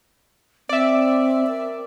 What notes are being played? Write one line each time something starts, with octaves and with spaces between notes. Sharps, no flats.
C4 D5 E5
A#4